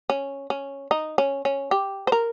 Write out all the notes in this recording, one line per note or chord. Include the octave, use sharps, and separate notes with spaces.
C#4
C#4
D#4
C#4
C#4
G4
C5
A#4